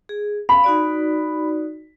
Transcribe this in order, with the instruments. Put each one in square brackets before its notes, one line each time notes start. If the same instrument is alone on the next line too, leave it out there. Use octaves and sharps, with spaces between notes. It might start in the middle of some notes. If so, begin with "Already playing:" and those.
[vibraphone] G#4
[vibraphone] F5 [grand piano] B5
[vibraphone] D#4 F#4 D5